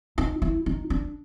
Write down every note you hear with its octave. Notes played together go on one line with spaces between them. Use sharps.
D#4
E4
D#4
D4